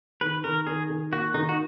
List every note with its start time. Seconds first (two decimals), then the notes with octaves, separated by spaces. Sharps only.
0.21 D#3 B4
0.44 D#3 A#4
0.67 D#3 G#4
0.90 D#3
1.12 A#3 F#4
1.34 D#3 D#4
1.49 F#4